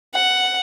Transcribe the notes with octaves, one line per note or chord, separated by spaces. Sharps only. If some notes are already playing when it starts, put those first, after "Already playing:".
F#5